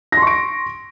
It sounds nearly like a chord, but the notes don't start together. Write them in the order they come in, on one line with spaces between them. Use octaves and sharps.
A#6 C6 C#6 D7